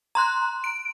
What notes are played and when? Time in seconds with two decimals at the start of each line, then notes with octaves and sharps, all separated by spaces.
0.15 A#5 C6 F#6
0.64 D7